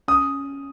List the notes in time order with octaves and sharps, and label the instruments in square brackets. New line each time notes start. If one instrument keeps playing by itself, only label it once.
[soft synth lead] C#4 [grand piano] D#6